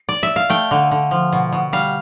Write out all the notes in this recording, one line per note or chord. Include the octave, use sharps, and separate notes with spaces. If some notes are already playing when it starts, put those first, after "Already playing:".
Already playing: C5
D5
E5
F5
A3 G5
D3
D3
F3
B2
B2
G3 F5